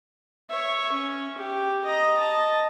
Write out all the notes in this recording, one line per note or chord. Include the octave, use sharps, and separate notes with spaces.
C#5 E5
C#4
G4
D#5 A#5
D#5 A5